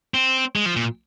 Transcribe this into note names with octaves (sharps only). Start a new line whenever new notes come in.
C4
G#3
F3
A#2